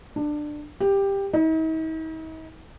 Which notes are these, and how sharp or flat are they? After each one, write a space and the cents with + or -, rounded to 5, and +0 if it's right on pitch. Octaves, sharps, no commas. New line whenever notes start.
D4 +20
G4 +10
D#4 +45